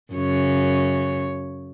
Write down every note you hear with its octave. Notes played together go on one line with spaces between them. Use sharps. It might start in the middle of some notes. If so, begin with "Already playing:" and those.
F#2 C#3 C#5